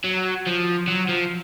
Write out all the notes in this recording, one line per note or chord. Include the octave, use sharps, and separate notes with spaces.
F#3
F3
F#3
F3